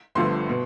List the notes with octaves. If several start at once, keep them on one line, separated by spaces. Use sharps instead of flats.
G1 G2 D3 F3 A3 C6
B2